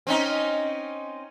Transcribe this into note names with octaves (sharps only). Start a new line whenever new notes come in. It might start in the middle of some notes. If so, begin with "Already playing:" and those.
C4 C#4 D#4